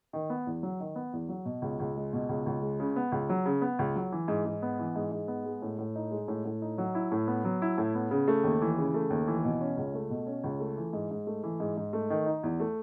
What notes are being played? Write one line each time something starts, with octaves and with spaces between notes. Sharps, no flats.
D#3
B3
E2
F#3
D#3
B3
E2
F#3
B2
C#2
C#2
G#3
B2
C#2
C#2
G#3
C#3
B3
C#2
F#3
C#3
B3
C#2
F#3
E3
G#2
G#2
B3
E3
G#2
G#2
B3
G#3
A2
A2
D#4
G#3
A2
A2
D#4
F#3
E4
A2
B3
F#3
E4
A2
B3
C#3
A3
D#2
E3
C#3
A3
D#2
E3
B2
C#4
C#2
A3
B2
C#4
C#2
A3
E3
G#2
G#2
A3
E3
G#2
G#2
A3
D#3
D#4
E2
A3